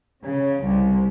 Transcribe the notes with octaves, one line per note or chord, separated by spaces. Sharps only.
C#3
C2